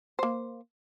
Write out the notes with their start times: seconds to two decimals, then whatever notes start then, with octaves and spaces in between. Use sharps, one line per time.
0.19 A#3 C5